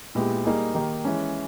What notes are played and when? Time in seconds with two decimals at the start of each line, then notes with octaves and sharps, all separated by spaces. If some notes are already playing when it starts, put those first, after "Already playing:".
0.15 A#2 G#3 B3 E4 G4
0.45 G3 A#3 D#4 G#4
0.75 D#3 A#3 D#4 G4
1.05 E3 G#3 C#4